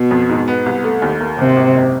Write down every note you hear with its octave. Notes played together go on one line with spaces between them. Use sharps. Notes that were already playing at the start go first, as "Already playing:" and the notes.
Already playing: B2
F2
G#2
B3
C2
A3
D#2
A#3
G#1 C3
G#1
F#1